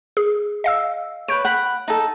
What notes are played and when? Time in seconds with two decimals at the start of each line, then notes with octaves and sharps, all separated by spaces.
0.17 G#4
0.64 D#5 F5 E6
1.28 B4 C#5 G6 D7
1.45 F#5 B5
1.88 D#4 A4